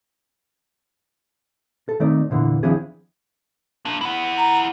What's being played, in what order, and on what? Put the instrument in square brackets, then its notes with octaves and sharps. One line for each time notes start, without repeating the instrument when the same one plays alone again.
[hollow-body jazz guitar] A4
D#3 A3 C4 D#4 D5
E2 A#2 D3 E3
D#3 F3 C4 D4 E4 G#4
[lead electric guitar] A#3 D4
E4 F#5
[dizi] A#5